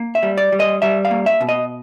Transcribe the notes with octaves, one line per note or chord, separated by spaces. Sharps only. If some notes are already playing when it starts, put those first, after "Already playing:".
Already playing: A#3
E5
G3
D5
G3
D#5
G3 E5
F5
A#3
E5
B2
D#5